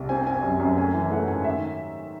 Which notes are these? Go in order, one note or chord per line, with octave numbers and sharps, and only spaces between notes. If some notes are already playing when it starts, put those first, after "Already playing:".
Already playing: C2
C4 G#5
C4 G#5
F#2
F#2
A3 G#5
E3 G#5
A3 F#5
G#2 G#5
D#3 E5